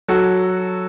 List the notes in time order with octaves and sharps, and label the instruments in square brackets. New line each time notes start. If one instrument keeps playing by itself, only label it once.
[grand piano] F#3 F#4 A4